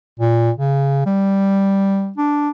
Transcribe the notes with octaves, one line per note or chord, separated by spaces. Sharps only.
A#2
C#3
G3
D4